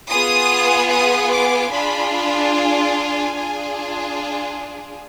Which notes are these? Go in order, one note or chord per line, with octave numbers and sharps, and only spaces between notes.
B3 F4 G#4 D#6
D#6
D6
D4 F4 G#4 B5
B5
G#5
D4 F4 G#4